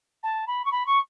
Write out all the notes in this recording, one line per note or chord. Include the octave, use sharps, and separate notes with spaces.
A5
B5
C#6
B5
C#6